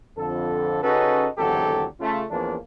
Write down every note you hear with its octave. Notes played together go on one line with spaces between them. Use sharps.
F2 D3 A4
C#3 C#4 D#4 F#4 A4 B4
G#1 E2 D3 F#3 G4 A4
C#3 A3 F4
E2 F3 A#3 C#4 D4